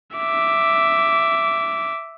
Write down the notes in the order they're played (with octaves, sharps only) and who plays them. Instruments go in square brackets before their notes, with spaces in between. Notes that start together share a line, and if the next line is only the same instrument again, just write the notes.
[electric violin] E5 D6